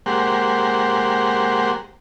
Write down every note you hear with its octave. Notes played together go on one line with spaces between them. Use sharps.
G#3 A#3 G4 C5 F#5